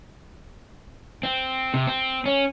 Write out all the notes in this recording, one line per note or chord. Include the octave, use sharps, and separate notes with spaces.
C4
C3
C4
C#4